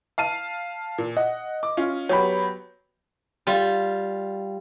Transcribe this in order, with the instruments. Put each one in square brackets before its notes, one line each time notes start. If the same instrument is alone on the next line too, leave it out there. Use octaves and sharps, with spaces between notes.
[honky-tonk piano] F5 A5 D#7
A#2
[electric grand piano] D#5 [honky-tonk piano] F#5
[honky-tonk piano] D6
C#4 F4
[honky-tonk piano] F#3 B3 G4 [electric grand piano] C#5 B5
[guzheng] G3 F4